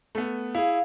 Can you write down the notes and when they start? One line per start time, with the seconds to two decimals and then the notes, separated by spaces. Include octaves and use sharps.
0.15 A3 B3
0.55 E4 G#4 F5